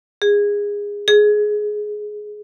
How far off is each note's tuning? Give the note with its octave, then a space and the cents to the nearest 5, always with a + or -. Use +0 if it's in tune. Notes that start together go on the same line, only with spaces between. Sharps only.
G#4 -20
G#4 +15